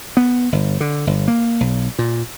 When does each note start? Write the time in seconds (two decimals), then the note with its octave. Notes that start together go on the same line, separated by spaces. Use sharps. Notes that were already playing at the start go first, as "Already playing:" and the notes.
0.17 B3
0.52 G1
0.80 D3
1.07 G1
1.28 A#3
1.60 B1
1.99 A#2